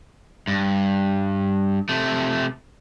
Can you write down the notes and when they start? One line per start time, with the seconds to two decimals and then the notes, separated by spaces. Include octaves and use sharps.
0.48 G2
1.89 C3 A3